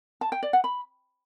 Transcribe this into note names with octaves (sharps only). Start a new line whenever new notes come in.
A5
G5
D5
F#5
B5